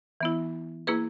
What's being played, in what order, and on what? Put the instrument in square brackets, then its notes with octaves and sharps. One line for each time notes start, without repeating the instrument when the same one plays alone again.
[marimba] E3 B3 E4
A#3 E4 G#4 B4